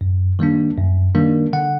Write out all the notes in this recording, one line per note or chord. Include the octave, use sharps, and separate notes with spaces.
F#2
D#3 G3 A#3 D4
F#2
D#3 G3 A#3 D4
D3 F#5